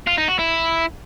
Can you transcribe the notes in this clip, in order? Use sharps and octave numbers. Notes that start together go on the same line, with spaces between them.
F4
D#4
F#4
E4